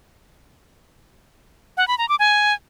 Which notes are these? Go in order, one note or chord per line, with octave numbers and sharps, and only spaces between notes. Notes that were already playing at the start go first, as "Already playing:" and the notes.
F#5
B5
A#5
D6
G#5